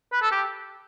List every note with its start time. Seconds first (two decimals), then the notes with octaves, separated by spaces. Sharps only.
0.12 B4
0.22 A4
0.31 G4